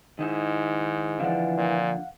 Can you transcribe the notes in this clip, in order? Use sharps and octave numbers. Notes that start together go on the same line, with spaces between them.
G#2 D#3 D#4 E4
D3 E3 F3 D5 F5 F#5
A#2